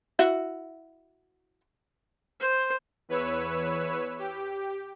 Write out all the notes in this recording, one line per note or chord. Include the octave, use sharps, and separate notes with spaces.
E4 F#4 E5
C5
E2 B4 C#5 E6
G4